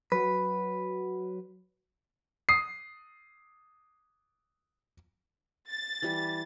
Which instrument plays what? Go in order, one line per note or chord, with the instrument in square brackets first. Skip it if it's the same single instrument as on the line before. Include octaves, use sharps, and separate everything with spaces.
[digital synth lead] F#3 [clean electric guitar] B4
[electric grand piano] D#6 C7
[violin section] A6
[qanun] E3 G3